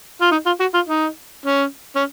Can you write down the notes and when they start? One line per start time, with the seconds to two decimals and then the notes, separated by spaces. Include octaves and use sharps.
0.22 F4
0.31 D#4
0.46 F4
0.60 F#4
0.74 F4
0.89 D#4
1.46 C#4
1.96 C#4